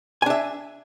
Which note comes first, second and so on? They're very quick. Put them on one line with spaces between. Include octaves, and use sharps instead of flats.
G#5 D4 E5